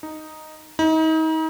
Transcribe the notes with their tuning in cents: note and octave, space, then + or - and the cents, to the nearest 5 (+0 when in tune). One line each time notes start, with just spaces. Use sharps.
D#4 +0
D#4 +35